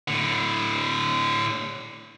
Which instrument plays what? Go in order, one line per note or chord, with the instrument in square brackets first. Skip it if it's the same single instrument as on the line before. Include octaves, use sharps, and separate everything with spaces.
[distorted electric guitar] A2 D3